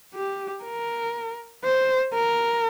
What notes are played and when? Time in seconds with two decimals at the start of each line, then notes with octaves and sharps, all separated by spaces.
0.14 G4
0.64 A#4
1.64 C5
2.14 A#4